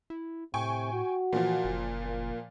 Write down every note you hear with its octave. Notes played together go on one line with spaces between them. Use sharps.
E4
A2 C3 G5 G#5 C#6
F#4
A#2 E3 F3
F#1
A#3